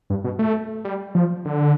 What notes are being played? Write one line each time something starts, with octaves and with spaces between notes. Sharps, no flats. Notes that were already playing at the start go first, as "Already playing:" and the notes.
G2
B2
A3
G3
F3
D3